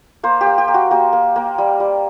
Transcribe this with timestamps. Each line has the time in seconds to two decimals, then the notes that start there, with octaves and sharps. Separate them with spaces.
0.23 A#3 C5
0.41 G4
0.46 A#3
0.58 G4
0.68 A#3
0.74 F#4
0.91 A#3 G4
1.13 A#3
1.36 A#3
1.58 G3
1.80 G3